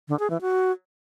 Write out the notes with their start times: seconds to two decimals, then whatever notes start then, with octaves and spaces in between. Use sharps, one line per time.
0.08 D3
0.19 G#4
0.30 E3
0.41 F#4